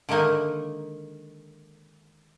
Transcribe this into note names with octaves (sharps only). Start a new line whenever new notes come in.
D3 D#3 G#3 A#3 D#4